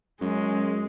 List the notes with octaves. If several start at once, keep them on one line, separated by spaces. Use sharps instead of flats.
F#2 G#3